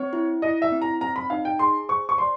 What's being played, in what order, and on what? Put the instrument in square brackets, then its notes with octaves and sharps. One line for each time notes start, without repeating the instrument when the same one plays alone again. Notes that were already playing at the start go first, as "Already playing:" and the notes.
Already playing: [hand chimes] C4 [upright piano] C#5
[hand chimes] E4
[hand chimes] E4 [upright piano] D#5
[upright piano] E5
[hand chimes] C4
[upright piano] A#5
[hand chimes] C4 [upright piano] A#5
[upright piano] B5
[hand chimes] D#4 [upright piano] F5
[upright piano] G5
[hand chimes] G#4 [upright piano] C6
[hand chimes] C5 [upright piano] C#6
[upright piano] C#6
[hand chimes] D5 [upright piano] C6